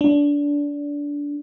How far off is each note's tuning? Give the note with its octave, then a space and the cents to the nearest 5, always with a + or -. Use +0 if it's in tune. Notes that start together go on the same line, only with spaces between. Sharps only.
D4 -20